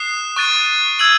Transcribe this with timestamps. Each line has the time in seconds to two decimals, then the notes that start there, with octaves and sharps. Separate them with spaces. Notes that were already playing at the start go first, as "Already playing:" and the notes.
Already playing: D#6 F#6 C7 E7
0.36 C#6 F#6 A6 D#7
0.99 E6 G#6 D#7 F#7